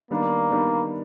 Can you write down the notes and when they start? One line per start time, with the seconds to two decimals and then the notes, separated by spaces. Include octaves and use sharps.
0.10 D#3 G3 A#3 B3 D4
0.51 D#3 G3 B3 D4